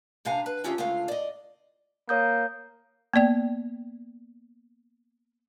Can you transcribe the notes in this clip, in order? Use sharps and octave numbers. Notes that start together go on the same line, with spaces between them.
F#2 C3 D4 F5 G#5 A#5
B4
D3 C#4 F4 G4 G#4 E5
D2 C#3 G#3 A3 F4 F5
D5 D#5
A#3 C#5 D#6 G6
A#3 B3 D5 G5